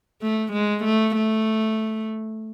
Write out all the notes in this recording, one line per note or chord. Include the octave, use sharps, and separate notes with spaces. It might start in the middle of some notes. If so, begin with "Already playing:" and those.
A3
G#3
A3
A3